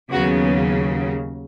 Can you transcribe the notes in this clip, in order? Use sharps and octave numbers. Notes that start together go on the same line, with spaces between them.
D#2 C#3 F#3 B3 F#4